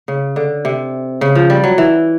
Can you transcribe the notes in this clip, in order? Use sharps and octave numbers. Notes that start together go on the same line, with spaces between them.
C#3
D3
C3
C#3
F3
G3
F#3
E3